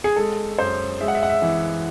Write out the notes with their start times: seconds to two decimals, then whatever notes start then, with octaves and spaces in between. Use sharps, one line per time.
0.04 G#4
0.16 G#3 A4
0.58 F#2 C5
1.00 G#3 E5
1.08 F#5
1.15 E5
1.23 F#5
1.29 E5
1.42 E3